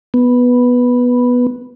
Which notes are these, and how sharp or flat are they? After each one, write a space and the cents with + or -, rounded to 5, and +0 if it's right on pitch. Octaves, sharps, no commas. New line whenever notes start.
B3 -5